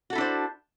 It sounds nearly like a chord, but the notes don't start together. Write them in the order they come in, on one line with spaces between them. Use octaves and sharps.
F#4 A4 E4 D4 C5